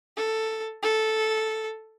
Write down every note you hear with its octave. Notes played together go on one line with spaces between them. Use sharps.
A4
A4